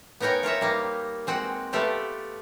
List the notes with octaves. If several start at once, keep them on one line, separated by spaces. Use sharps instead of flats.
B3 D#4 A#4 C#5 G5 G#5
F4 A#4 C#5 E5
G3 A#3 D#4
G#3 C4 F#4
A3 B3 F4 G4 A4 D5